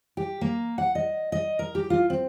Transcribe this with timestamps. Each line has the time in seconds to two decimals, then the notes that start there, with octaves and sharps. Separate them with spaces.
0.17 G4
0.41 A#3
0.78 F#5
0.95 D#5
1.32 D#5
1.59 A#4
1.75 G4
1.90 F4
2.10 C4